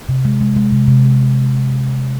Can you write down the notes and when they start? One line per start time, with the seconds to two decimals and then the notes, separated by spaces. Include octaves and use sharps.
0.09 C3
0.25 G#3
0.41 G#3
0.57 G#3
0.72 C3
0.88 C3